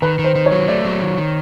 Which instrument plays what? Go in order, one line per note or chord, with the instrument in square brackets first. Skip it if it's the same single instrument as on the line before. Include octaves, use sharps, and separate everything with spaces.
[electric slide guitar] D#3 [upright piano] B4
[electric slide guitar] D#3
[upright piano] C5
[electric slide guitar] D#3
[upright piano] C#5
[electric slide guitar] F#3
[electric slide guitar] A3 [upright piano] D5
[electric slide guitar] F#3
D#3
D#3